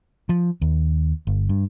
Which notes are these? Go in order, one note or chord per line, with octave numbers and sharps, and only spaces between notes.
F3
D#2
G1
G2